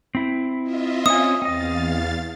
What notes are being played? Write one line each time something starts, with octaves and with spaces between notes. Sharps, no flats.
C4 E4
F4 D#5 E5
C4 C#4 G#5 D#6
E2 C4 D#5 F5 A6